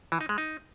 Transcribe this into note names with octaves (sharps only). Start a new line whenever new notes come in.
E3
D#4
G#3
D#4